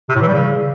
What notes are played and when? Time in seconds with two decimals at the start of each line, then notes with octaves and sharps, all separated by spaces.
0.09 C3
0.15 A2
0.21 E3
0.27 G3
0.33 C#3